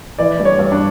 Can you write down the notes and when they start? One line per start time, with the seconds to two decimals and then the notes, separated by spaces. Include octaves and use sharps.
0.19 E3 D5
0.39 G2
0.45 C#5
0.59 G2
0.72 D4